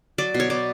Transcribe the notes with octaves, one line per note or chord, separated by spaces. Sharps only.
F#3 D5
B2
C#5
B2 D5